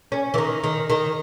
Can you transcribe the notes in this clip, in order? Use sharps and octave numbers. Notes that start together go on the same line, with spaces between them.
C#4
E3
D#3
D#3
D#3